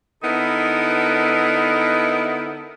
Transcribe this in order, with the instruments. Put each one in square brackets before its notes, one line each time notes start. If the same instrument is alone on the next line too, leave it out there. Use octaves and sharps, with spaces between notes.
[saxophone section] D3 B3 D#4 E4 A4 A#4